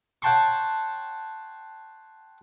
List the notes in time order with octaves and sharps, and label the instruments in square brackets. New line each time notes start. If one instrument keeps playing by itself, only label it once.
[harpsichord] C#5 F#5 G5 A5 C6 C#6